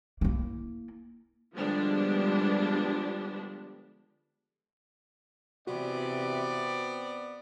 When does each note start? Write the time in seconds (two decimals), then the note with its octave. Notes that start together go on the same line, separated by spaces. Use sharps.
0.21 A#3 E4
1.55 D3 F3 G3 G#3 B3 D4
5.67 C3 E3 B3 C4 F#4 D5